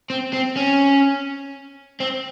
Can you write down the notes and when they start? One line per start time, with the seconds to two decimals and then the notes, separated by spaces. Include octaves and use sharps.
0.10 C4
0.33 C4
0.57 C#4
2.00 C4